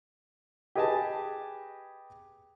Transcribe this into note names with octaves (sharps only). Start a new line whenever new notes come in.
G4 G#4 B4 D#5 G#5 A5